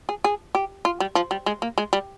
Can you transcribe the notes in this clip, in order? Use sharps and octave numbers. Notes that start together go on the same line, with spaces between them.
G#4
G#4
G4
F4
G3
F3
G3
G#3
A#3
G#3
G3